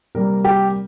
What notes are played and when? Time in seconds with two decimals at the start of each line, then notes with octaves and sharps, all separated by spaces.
0.15 C3 G3 A#3 A#4
0.45 G4